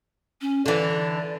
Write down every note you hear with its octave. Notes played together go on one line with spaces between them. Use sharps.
C#4
D3 E3 D5